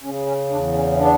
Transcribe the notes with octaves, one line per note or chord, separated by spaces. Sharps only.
C#3 C#4
C#4
E2 D4
C#4
E4
B3 D4